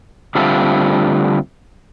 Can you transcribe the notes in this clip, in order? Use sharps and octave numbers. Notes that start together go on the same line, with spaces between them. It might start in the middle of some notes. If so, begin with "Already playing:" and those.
D3 G3 A3 C4 F4